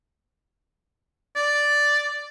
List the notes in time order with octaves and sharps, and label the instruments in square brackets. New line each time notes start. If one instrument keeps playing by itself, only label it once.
[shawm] D5